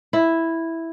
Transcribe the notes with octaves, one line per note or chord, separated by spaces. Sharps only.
E4